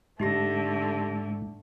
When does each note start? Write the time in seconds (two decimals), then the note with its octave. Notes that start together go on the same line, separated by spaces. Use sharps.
0.20 G#2 D3 A3 D#4 G4 A#6